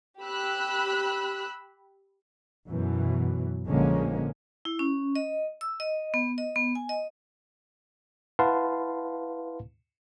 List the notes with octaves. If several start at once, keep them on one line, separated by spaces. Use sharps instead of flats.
G4 B5 E6 F#6
F#2 B2 E3
A#1 D3 F3 G#3 A#3 C#4
E4
C#4
D#5
E6
D#5
B3
D#5
B3
G#5
D#5
E4 B4 F5 F#5 A5 C6